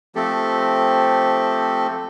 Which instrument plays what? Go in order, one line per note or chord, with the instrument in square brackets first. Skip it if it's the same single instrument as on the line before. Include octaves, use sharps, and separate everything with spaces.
[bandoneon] F3 A3 C4 G4 A4